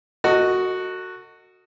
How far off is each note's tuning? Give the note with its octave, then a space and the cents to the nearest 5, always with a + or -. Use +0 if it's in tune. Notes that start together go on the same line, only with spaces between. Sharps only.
F#4 +0 A4 +45 D#5 +0